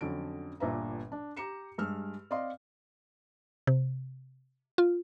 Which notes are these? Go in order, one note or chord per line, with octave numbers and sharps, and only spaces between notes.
F2 D3 F#3 C#4 D7
G1 A#2 D4 B4 E5 A#5
D4
G4 A#5 C#7 E7
G2 G#3 E6 F6
C4 D5 D#5 F5 C6
C3
F4